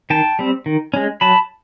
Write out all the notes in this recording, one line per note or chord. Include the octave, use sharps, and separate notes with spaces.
D#3 G5 A5
G3 C4
D#3
G#3 C#4
F#3 A5 B5